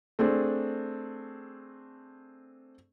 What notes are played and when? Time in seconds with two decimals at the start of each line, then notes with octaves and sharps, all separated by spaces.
0.19 A3 C4 D4 G#4